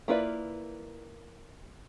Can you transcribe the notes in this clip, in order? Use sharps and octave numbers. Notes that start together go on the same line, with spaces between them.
A#3 E4 F4 B4 D5